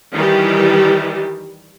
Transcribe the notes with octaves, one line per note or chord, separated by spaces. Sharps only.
D#3 E3 G3 G4